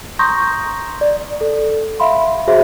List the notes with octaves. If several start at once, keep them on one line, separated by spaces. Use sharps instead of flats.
A#5 C6 C#6 D#6 G6 A#6
D5
A4
E5 F5 B5 C6
F#4 G#4 C5 E5